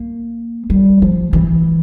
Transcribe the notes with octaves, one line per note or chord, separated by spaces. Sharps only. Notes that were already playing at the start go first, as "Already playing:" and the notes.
Already playing: A#3
G3
F3
E3